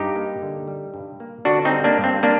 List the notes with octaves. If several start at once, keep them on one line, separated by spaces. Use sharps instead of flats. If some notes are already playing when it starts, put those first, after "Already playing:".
Already playing: G2 D#4 G4
A#3
D3
G3
G2
A#3
D3 D4 F#4
C4 D#4
G3
A#3 D4
G2
C4
A#3 D4